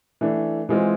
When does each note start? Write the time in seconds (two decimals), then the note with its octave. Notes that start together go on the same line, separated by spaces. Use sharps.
0.21 E3 A3 D4
0.69 E3 G#3 C4 F4